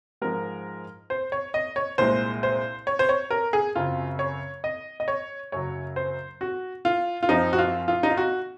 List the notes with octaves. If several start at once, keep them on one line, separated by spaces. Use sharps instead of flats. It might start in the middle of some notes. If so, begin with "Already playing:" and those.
G#2 F3 G#3 A#4
C5
C#5
D#5
C#5
C2 A#2 G#3 C5
C5
C#5
C5
C#5
A#4
G#4
F#2 C#3 F#3 C4 F4
C#5
D#5
D#5
C#5
F#2 C#3 F#3 C#5
C5
F#4
F4
F4
F#2 F3 C4 D#4
F#4
F4
F4
D#4
F4
F#4